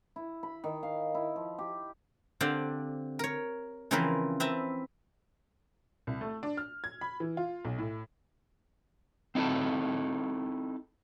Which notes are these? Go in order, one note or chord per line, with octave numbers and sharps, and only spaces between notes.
E4
B5
D#3
F5
E4
F3
G4
D3 C4 D4 G4 D5 F5
A#4 C#5
C#3 E3 F3 C4 A#4 B4
C4 B4 E5 A5 A#5
C2
A3
D4
F6
G#6
B5
E3
F4
B1
A2
C4 D#4 E4 A4 A5